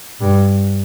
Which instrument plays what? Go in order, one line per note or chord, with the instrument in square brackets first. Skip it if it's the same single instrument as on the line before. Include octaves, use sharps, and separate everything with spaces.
[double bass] G2